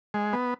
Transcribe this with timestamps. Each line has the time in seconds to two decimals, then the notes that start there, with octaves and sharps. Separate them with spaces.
0.14 G#3
0.33 B3